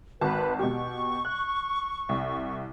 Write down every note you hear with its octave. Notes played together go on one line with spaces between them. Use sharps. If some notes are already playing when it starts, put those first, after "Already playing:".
G#1 F#4 B4 A5
B2 G4 C#6
F#6
C2